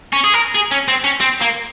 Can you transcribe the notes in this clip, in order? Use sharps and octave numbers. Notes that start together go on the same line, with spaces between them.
C#4
G#4
A#4
G#4
C#4
C4
C#4
C4
A#3